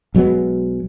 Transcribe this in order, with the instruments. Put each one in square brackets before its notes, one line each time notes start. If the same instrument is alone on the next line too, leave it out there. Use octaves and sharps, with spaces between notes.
[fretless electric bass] B1 F#3 G#3 B3